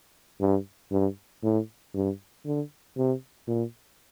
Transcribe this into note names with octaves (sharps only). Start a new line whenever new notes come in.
G2
G2
A2
G2
D3
C3
A#2